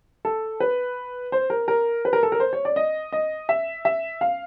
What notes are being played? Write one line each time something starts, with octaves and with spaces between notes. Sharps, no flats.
A4
B4
C5
A#4
A#4
B4
A#4
A4
A#4
C5
C#5
D5
D#5
D#5
E5
E5
F5